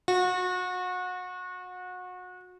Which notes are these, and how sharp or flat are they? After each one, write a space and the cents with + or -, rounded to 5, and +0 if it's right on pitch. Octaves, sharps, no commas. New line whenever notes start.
F#4 -30